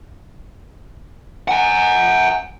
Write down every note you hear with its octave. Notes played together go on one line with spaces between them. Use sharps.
F#5 G#5